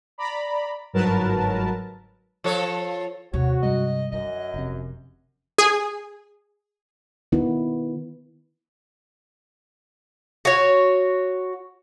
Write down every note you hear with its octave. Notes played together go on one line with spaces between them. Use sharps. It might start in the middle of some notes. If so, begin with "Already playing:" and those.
D5 A#5 B5
G1 G#2 F#3 A#4 B4 A5
F3 A4 C#5
D#2 C3 F#4 C#5
G2 G3 G#3 D#5
F#2 D3 D#5
F1 C3
G#4
D#3 B3 E4
F#4 C#5